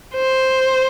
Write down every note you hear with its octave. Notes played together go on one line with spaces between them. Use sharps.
C5